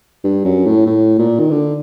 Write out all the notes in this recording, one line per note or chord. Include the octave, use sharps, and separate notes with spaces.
G2
F#2
A2
A2
A#2
D#3
D3